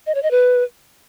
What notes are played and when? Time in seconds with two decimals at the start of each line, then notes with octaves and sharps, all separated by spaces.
0.06 D#5
0.15 C#5
0.23 D#5
0.31 B4